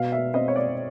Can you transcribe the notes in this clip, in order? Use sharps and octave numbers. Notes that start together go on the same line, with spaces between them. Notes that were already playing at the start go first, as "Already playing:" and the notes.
Already playing: B2 F5
E5
C4 D#5
C#5
D5